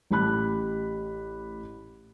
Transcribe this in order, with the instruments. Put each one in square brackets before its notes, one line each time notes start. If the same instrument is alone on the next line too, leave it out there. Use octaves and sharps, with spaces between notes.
[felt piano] A1 G4 B5 F#6